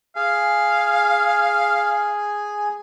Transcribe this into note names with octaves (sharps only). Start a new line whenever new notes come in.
G#4 F5 G#5